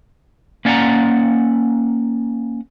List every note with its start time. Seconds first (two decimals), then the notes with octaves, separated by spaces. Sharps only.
0.65 A#3 C#4 D5 F5 F#5 A#5